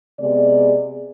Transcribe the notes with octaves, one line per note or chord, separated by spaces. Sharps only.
C3 G#3 B3 G4 G#4 D5